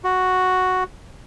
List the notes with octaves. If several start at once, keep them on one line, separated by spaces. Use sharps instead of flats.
F#4